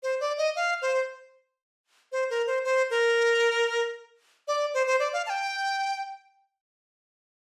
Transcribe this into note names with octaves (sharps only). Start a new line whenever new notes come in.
C5
D5
D#5
F5
C5
C5
A#4
C5
C5
A#4
D5
C5
C5
D5
F5
A5
G5